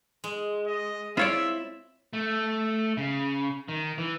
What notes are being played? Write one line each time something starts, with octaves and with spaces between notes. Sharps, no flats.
G#3
D#5
C4 E4 F4 C#5 D5 E5
A3
C#3
D#3
E3